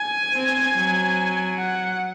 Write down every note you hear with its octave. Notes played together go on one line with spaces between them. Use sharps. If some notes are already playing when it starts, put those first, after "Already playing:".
Already playing: G#5
C4
F#3
F#5